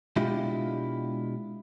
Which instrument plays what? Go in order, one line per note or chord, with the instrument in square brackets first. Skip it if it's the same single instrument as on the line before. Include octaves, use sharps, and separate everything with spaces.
[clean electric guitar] B2 G#3 D4 E4 F4 G4